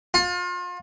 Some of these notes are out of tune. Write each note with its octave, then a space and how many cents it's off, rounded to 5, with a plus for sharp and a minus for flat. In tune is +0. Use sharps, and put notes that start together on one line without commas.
F4 +35